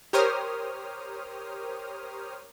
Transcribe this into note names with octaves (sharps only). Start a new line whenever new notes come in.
G4 A#4 C5 C#5 D#6 F6